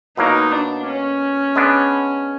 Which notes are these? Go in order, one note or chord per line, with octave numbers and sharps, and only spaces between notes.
B2 F#3 A#3 D#4
D4
C#4
G#3 B3 D4